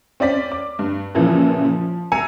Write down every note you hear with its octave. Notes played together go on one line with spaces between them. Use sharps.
C4 C#4 D5 B6
D6
G2
F#2 A#2 C#3 E3 F3
F3
C2 G#5 A#5 E6 C#7